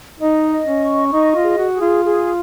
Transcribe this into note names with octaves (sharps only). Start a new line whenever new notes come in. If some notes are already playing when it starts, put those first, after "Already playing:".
D#4 D#5
D#5
C#4
C#6
D#4 D#5
F4
G#4
F#4
G#4
F4
G#4